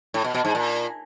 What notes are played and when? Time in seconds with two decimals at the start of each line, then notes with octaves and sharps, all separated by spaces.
0.14 A2
0.24 B2
0.34 B2
0.45 G#2
0.55 A#2